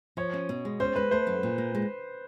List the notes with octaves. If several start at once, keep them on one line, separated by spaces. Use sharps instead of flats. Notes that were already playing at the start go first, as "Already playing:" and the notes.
F3 C#5
C#4
B2
G#3
C#4 C5
G#3 B4
A3 C5
F#2
A#2
A#3
G#3